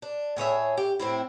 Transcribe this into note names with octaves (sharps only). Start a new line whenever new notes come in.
D4
A2 G#4 C#5 E5
G4
A2 C4 E4